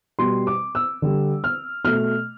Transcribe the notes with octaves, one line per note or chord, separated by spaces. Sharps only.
B2 G3 C6
D6
E6
D3 G3
F6
B2 A3 F6